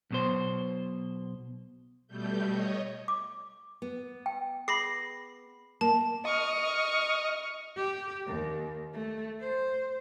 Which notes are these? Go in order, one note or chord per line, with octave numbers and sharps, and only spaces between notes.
B1 B2 C5
B2 G3 A3 G6
C#5 D#5
D6
B3
G5
G#4 B5 A#6 C7
A#3 A5
D#5 C#6 F6
G4
D#2
A3
C5